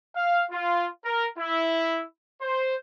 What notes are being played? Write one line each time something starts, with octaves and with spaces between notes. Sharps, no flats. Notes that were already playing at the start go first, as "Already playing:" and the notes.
F5
F4
A#4
E4
C5